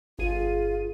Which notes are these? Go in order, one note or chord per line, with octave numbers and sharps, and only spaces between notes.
G1 F4 G#4 D#7